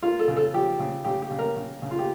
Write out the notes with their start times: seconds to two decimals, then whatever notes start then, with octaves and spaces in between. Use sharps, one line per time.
0.03 A#3 F4
0.19 A4
0.28 C#3
0.37 A4
0.53 F3 G4
0.79 C#3
1.04 C#3 G4
1.22 G4
1.30 C#3
1.39 A#4
1.56 C#3
1.82 C#3
1.91 F4
1.99 G4